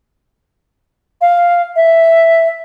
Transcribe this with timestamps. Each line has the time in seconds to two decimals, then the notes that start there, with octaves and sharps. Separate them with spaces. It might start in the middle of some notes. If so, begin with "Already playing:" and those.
1.21 F5
1.76 E5